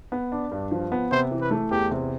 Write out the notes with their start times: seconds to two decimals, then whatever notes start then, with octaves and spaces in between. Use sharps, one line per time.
0.12 B3
0.32 D4
0.51 G2
0.71 F3
0.92 B3
1.11 C3 C5
1.31 E3
1.41 B4
1.51 A3
1.71 E2 G4
1.91 C3